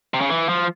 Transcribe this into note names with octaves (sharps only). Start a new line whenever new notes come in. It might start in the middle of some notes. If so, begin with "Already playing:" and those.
C3
C#3
E3
F3